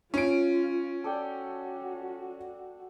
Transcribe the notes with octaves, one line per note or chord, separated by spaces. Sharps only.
C#4 F4 D7
F#4 A4 D5 G5